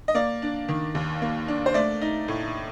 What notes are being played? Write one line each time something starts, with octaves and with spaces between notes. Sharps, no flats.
D#5
A#3 D5
D4
D#3
D#2
A#3
D4
C5
A3 D5
D#4
A2